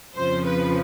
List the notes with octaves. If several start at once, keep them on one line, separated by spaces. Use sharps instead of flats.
F2 C#3 F3 C5
B4